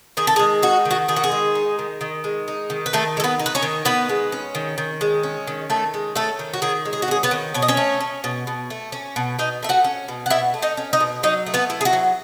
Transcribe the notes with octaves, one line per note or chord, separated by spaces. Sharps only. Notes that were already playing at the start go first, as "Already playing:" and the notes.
D#3 G#4
A4
G#4
G#3
D#4 F#4
D#3
F#4
D#3 G#4
F#4
G#4
G#3
D#4
D#3
D#3
G#3
D#4
D#3
B4
D#3 A3 A4
G#3
A4
B3 B4
D#4
B4
C#4 C#5
D#3
D#3 B3 B4
G#3
C#4
D#3
D#3
G#3
C#4
D#3
D#3 A3 A4
G#3
A3 C#4 A4
D#3
F#4
D#3 G#4
G#3
G#4
F#4
C#4 G#4
B3 B4
D#3
B2 C#5
D#5
C#4 C#5
A3
C#4
B2
B2
A3
C#4
B2
B2 D#4 D#5
A3 E5
F#4 F#5
C#4
B2
F#5
B2 E4 E5
A3
D#4 D#5
C#4
D#4 D#5
B2
F#3 D#4 D#5
A3
B3 B4
E4
G#4
F#4
F#3